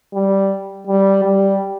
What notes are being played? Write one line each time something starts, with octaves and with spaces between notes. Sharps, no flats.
G3
G3
G3